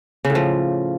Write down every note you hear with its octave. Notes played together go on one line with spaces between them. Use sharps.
C#3
A2
F3